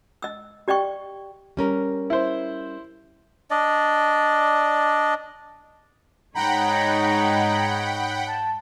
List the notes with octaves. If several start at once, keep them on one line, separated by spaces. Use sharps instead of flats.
D#5 E6
G4 D5 D#5 G5 C#6
G3 C#4 A#4
E4 C5
D4 D5 D#5
G#2 D#4 C#5 F#5 G5 A#5 B5
A5